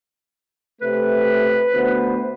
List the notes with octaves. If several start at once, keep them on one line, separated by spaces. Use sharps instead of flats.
C3 A3 B4
D2 B3 C5